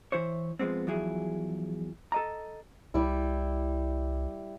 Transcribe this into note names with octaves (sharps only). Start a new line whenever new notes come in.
E3 E4 C5 C#5
F3 F#3 G#3 B3 C4
E2 F3 F#3 E4 G#4
A4 D#5 A#5
C2 G3 E4